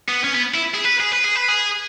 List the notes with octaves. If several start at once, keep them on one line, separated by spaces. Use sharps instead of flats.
B3
C#4
B3
E4
G#4
B4
G#4
B4
G#4
B4
G#4